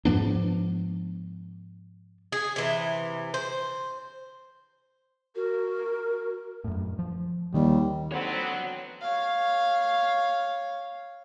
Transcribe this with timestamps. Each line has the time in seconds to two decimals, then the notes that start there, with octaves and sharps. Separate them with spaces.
0.05 G#2 F3 B3 D4
2.32 G#4
2.56 C3 E3
3.34 C5
5.36 F#4 A#4
6.64 F#2 A2
6.99 F3
7.54 D#2 D#3 G3
8.12 D3 B3 C4 C#5 F#5
9.01 C#5 F5